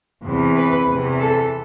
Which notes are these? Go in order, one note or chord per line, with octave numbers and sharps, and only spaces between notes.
E2 C3 E3
B4
E2 C3 E3
A4